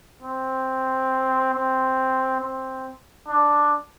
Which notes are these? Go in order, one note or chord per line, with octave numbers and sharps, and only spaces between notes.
C4
C4
C4
D4